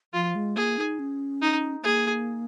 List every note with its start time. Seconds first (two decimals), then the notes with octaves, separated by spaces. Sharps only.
0.14 F3 F4
0.35 G#3
0.56 A#3 G#4
0.78 D#4
0.99 C#4
1.42 D#4
1.83 A#3 G#4